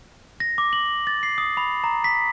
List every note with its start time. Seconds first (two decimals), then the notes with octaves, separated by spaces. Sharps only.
0.40 A#6
0.58 D6
0.73 F#7
1.07 A6
1.23 C7
1.38 D#6
1.57 B5
1.84 A#5
2.04 B6